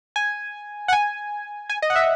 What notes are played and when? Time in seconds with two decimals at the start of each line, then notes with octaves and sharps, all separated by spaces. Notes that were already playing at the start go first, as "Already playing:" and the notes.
0.16 G#5
0.88 F#5
0.93 G#5
1.70 G#5
1.82 D#5
1.90 F#5
1.96 E5